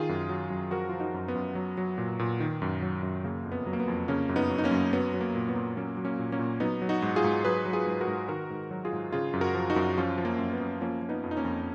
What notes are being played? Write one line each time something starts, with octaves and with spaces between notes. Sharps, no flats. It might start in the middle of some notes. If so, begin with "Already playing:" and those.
Already playing: D#3 F4 G#4
F#2
F#3
F#2
F3 F#4 A#4
F3 F4
D#4 F#4
F#2
B3
F#2
F#3
F#3
A#2
A#2
D#3
F#2
F#3
F#2
C#3 A#3
F2
B3
F#3
A#3
B3
F2
C#3 A#3 C#4
F#2
B3 D#4
F#3
D#4
A#3 C#4
F#2
F#3 B3
F#3
A#3
A#2
B3
A#2
F#3 A#3 C#4
F#3
A#3 C#4
A#2
A#3 C#4
A#2
F#3 B3 D#4
F#3
D#4 F#4
G#2
F4 G#4
G#2
F#3 G#4 B4
F#3
F4 G#4
G#2
F#4 A#4
G#2
D#3 F#4 A#4
G#2
F#3
F4 G#4
G#2
C#3 F4 G#4
F#2
F#4 A#4
F3
D#4 F#4
F#2
F3 C#4 F4
F3
A#3 C#4
F#2
B3
F#2
F3 A#3 C#4
F3
B3 D#4
F2
D#4
A#3 C#4
F2